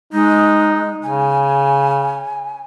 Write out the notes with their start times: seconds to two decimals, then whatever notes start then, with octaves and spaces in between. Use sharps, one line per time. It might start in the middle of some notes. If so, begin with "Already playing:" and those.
0.13 G#3 D#4
1.03 C#3 G#5